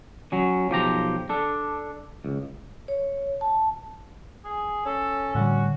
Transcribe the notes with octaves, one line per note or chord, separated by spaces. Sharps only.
F#3 C#4
B1 F3 G4 A#5
D4 A4
C#2
C#5
A5
G#4
C#4 A4
A2 D3 G3 F#4